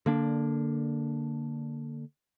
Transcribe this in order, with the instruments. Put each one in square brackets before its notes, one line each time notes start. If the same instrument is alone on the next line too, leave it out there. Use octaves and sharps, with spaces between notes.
[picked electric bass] D3 A#3 D4